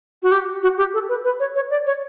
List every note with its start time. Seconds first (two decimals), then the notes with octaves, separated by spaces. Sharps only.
0.23 F#4
0.32 G4
0.63 F#4
0.78 G4
0.94 A4
1.09 B4
1.24 B4
1.40 C#5
1.56 C#5
1.70 D5
1.86 C#5